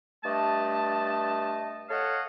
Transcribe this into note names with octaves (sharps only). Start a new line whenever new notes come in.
G2 A3 D#5 A5
A4 C#5 D#5 F5 F#5